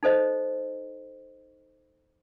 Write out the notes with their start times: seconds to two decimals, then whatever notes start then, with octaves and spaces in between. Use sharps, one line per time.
0.03 D#4 A4 C5 D#5